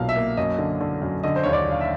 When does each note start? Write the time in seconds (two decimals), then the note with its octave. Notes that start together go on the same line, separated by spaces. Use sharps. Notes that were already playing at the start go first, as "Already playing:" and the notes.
Already playing: B1 A#2 A#3 F5
0.09 E5
0.16 A#3
0.37 F#2 D#5
0.58 D3
0.80 D3
1.02 F#2
1.23 D3 D#5
1.36 C5
1.43 D#2 C#5
1.53 D5
1.67 D3 F5
1.81 E5